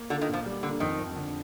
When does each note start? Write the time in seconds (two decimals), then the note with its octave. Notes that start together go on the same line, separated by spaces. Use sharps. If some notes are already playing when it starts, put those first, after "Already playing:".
Already playing: A#3
0.10 D3 F4
0.21 D#3
0.28 A#2
0.33 F3
0.46 G3
0.63 D3 A#3
0.80 F2 D#3
0.98 F2
1.16 D3